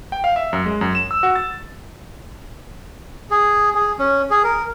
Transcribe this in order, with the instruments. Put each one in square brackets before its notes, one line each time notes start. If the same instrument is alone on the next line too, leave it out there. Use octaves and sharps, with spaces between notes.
[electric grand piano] G5
F5
E5
F#2
G#3
F#2
E7
E6
F#4
A6
[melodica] G#4
G#4
C#4
G#4
A#4